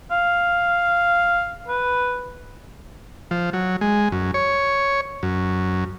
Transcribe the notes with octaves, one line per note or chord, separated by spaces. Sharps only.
F5
B4
F3
F#3
G#3
F#2
C#5
F#2